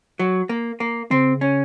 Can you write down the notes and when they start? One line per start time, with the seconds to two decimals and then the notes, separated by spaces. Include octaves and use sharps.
0.19 F#3
0.49 A#3
0.80 A#3
1.11 C#3 C4
1.41 C#4